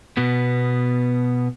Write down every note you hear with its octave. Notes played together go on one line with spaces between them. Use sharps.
B2 B3